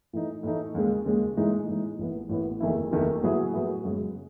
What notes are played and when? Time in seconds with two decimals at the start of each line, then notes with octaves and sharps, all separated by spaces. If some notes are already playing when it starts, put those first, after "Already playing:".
0.13 A2 E3 A3 D#4
0.43 A2 E3 A3 D#4
0.74 D#2 C#3 G#3
1.06 D#2 C#3 G#3
1.37 A2 E3 G#3 D#4
1.68 A2 E3 G#3 D#4
1.99 A1 A2 E3 B3
2.29 A1 A2 E3 B3
2.60 F#1 E2 D#3 A3 E4
2.91 F#1 E2 D#3 A3 E4
3.22 A2 F#3 B3 E4 G#4
3.54 A2 F#3 B3 E4 G#4
3.84 F#2 C#3 G#3